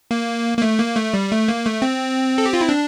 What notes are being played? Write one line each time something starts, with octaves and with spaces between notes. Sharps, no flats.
A#3
A#3
A3
A#3
A3
G3
A3
A#3
A3
C4
A4
G4
F4
E4
D4